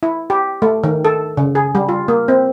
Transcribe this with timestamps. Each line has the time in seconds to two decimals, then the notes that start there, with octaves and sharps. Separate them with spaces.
0.03 E4
0.30 G4
0.62 A3
0.84 D#3
1.05 A4
1.37 C#3
1.55 G#4
1.75 G3
1.89 F4
2.08 A#3
2.28 C4